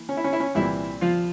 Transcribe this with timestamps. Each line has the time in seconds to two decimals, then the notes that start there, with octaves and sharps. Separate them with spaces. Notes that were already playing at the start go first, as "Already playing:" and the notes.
Already playing: E3 A#3
0.09 C#4
0.17 E4
0.24 C#4
0.33 E4
0.40 C#4
0.55 C2 A#2 E3 G3 C4 E4
1.01 F3 F4